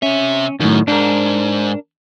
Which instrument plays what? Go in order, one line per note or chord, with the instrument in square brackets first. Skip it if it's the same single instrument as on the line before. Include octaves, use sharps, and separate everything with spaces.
[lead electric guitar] C3 E5 [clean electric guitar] C#4
[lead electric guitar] F#2 [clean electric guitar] A2 D#3
[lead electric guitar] G#2 [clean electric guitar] D4 A#4